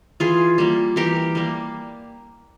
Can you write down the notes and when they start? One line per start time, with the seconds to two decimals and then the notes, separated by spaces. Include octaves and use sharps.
0.20 E3 F4 G#4
0.58 G3 A#3
0.96 E3 G4 A#4
1.35 G3 A#3